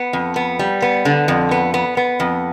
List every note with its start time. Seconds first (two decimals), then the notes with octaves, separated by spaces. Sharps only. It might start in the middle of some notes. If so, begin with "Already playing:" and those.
Already playing: B3
0.13 F2
0.36 B3
0.59 G3
0.82 B3
1.05 D3
1.28 F2
1.51 B3
1.74 B3
1.97 B3
2.20 F2